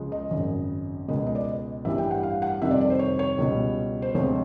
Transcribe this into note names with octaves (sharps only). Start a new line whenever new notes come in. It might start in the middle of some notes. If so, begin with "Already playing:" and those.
Already playing: C#2 C#3 F3 G#3
D#5
G#1 F#2 C#3
C#2 B2 G#3
D#5
D5
D#5
A1 G2 E3 G3 E5
G5
F#5
F5
F#5
F2 C3 D#3 G3 E5
D5
D5
C5
C#5
C#5
C#2 B2 G3
C5
D2 C3 F3 G#3 C#5